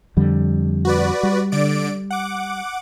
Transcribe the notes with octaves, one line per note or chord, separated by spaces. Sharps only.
F2 D3 G3
F#4 B4 D5
G3
D3 D5 D7
F#5 D6